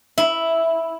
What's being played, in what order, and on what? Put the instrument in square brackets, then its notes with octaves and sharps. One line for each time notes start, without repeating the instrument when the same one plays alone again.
[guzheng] E4